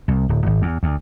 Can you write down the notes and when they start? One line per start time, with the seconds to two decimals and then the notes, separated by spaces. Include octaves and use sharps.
0.08 C2
0.29 D1
0.46 G#1
0.62 E2
0.83 D2